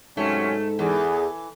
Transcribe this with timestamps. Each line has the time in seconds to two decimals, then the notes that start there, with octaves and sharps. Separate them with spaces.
0.17 G#2 C3 F#3 A3 C#4
0.79 E2 E3 G#4